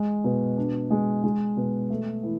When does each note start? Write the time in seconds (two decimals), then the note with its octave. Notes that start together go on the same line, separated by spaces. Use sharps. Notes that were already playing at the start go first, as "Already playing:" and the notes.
Already playing: G#3
0.24 B2
0.57 D4
0.91 G#3
1.24 G#3
1.57 B2
1.90 A3
2.23 E3